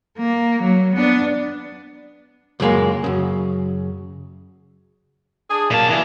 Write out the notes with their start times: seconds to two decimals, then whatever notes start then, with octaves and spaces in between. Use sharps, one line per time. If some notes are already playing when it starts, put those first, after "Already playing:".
0.18 A#3
0.62 F#3
0.95 B3 D4
2.60 C#2 F#2 G#3 A#3
3.04 F#2 C#3
5.49 D4 G#4
5.71 A#2 F#3 A#3 A5
5.90 E3 F#3 G3 B3